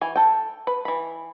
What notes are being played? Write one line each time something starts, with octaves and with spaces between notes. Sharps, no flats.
E3 G#5
A4 G5
B4
E3 B5